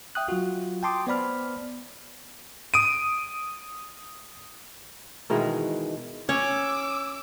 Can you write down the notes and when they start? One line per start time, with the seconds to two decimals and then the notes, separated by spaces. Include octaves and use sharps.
0.15 E5 G5 D#6 F#6
0.28 F#3 F4 F#4
0.83 G5 A5 C6 D6 D#6
1.07 B3 C5 D5 B5 F6
2.74 D#6 D7 D#7
5.30 B2 D#3 E3 G#3
6.29 C#4 C#5 D6 E6